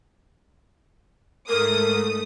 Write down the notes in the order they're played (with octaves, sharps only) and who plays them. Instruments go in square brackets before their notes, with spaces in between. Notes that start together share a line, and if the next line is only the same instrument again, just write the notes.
[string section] G#2 A3 D#6 [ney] A#4